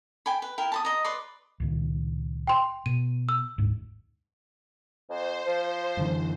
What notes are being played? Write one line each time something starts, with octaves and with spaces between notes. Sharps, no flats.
G5 G#5 B5
B4
E4 A#4 G5
A5 B5 D#6
D#5 A#5
B4 D5 C6
C#2 A#2 D#3
G5 C6
B2 D#7
E6
G1 D2 G#2
F2 C5
F3
F#2 D3 E3